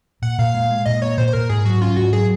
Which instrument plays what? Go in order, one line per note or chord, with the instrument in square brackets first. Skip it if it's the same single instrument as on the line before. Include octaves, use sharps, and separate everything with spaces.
[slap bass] A#2 [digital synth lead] F#5
[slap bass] A#2 [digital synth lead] F5
[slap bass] G#3
G#3
[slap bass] A#2 [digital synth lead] D#5
[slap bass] A#2 [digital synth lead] C#5
[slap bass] A#2 [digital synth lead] C5
[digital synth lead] C5
[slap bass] A#2 [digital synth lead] A#4
[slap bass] G#2 [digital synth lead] G#4
[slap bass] F#3 [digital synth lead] F#4
[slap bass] C#4 [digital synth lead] F4
[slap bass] G#2 [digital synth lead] F#4
[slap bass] F#3 [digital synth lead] G#4